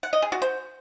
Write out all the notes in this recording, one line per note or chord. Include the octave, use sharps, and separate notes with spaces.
F#5
D#5
G#4
F#4
C5